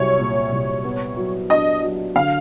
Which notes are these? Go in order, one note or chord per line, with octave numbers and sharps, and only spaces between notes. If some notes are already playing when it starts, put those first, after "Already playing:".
Already playing: C2 F#3 C#5
A#2
C2
B3
F#3
D4 D#5
F#3
D3 F5